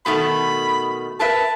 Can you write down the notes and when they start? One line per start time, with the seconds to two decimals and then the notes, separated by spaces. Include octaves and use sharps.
0.06 B2 D#3 A3 B5
1.20 A#4 B4 E5 A5